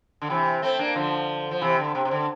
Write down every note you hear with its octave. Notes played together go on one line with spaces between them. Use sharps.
D3
C3 E3
A3 C4
A#3 D4
D3 F3
F3
C3 E3
D3
C3
C3
D3